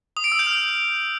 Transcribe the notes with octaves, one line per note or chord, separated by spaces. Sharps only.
D#6
D7
E6
G6
F6